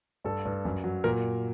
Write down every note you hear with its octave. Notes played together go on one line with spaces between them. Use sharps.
G2 A4
G2
F#2
F#3
A#2 A#4